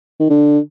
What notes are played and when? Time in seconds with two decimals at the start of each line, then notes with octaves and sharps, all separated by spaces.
0.20 D#3
0.30 D3